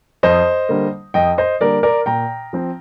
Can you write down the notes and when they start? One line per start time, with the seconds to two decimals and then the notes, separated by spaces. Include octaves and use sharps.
0.23 F2 C5 D#5
0.69 D3 G3 A#3
1.14 F2 D#5 G5
1.38 C5 D#5
1.61 D3 G3 A#3 A#4 D5
1.83 A#4 D5
2.06 A#2 G5 A#5
2.53 F3 C4